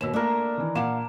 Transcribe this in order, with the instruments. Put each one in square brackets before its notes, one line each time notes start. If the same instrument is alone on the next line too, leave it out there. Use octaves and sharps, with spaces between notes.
[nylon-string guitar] D#2 B2 [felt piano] E6 E7
[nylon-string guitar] A3 A#3 [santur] D4 A#4
[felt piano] D#3 E3
[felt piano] A#2 D6 E7 [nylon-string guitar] F5 F#5